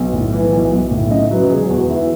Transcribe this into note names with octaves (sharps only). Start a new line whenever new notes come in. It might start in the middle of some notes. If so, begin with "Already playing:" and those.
Already playing: B1
A2
E3
B1
B1
A2
C#3 D#5
F#3 B4
E1 G#4
E2 F#4
E3 E4